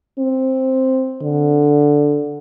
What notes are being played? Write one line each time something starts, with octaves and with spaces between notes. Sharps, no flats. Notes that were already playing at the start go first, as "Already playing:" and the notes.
C4
D3